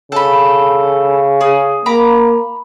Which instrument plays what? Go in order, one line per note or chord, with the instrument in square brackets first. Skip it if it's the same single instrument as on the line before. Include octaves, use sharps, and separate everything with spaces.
[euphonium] C#3 [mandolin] A4 B5
[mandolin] G#4
[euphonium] A#3 [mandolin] A#5 B5 D6